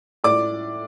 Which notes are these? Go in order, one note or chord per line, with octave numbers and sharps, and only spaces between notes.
A2 D5 D6